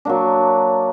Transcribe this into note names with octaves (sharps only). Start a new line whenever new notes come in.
F#3 A#3 D4